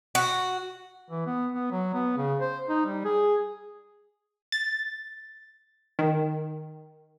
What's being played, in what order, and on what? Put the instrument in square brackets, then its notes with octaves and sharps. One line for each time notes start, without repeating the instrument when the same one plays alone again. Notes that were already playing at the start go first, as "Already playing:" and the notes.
[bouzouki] F#4
[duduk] E3
B3
B3
F#3
B3
C#3
C5
D#4
G3
G#4
[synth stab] A6
D#3